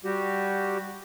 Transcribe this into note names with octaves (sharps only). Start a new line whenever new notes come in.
G3 F#4 G4